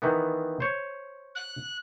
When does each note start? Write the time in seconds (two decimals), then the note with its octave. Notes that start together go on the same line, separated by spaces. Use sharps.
0.02 D#3 E3 B3
0.60 C5 C#5
1.35 F#6